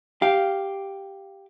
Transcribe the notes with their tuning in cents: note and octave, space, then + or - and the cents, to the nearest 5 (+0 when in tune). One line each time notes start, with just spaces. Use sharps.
G4 +0 F5 +0